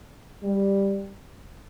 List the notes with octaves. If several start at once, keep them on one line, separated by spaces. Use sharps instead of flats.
G3